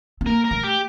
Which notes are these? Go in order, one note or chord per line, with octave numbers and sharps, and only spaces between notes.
C4
A#3 A#4
A#4
A3
G4